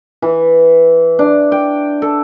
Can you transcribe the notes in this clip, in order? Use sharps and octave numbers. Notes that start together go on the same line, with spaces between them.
E3
D4
G5
A4